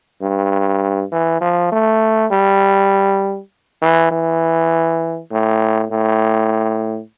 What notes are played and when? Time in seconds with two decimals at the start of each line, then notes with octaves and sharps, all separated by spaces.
0.22 G2
1.12 E3
1.41 F3
1.72 A3
2.31 G3
3.82 E3
4.11 E3
5.32 A2
5.92 A2